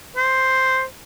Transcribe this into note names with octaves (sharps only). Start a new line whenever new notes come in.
C5